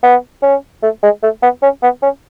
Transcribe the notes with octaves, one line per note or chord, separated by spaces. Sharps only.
B3
C#4
A3
G#3
A3
B3
C#4
B3
C#4